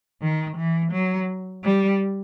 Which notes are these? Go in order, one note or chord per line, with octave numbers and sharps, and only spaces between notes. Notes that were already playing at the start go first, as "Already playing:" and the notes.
D#3
E3
F#3
G3